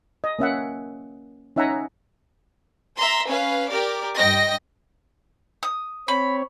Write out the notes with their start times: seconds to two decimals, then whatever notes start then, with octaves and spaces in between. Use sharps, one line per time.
0.24 D#5
0.39 A#3 C#4 E5 F#5
1.56 C#4 D#4 E5 F#5 G#5 A#5
2.97 E5 A#5 C6
3.28 C#4 B4 F5
3.69 G4 A#4 D5 D6
4.17 G2 D#5 G5 A#6
5.63 D#6
6.08 C4 C#5 B5